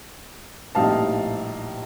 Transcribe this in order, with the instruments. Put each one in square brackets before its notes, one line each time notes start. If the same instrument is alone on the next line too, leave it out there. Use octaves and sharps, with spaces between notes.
[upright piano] A#1 A2 G3 C4 D#4 F5 A5